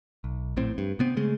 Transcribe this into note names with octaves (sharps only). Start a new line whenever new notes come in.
B1
A#1 A2 C4
G2
C3 B3 C4
C#3 G#3 A3